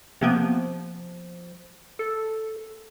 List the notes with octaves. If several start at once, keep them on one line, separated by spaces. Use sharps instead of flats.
C3 F3 A#3 B3
A4